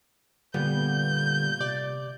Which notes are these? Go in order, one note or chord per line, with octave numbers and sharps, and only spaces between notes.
A#2 D3 G3 B3 G6
C3 D5